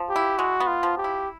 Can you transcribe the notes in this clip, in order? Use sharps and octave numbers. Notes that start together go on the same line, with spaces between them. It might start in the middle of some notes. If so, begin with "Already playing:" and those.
Already playing: F3
G4
E4
G#3 F#4
B3
F4
F3
G4
E4